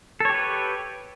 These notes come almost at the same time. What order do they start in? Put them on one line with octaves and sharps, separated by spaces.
A4 C#5 G4 B4